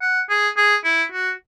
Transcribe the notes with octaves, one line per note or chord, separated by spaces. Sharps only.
F#5
G#4
G#4
E4
F#4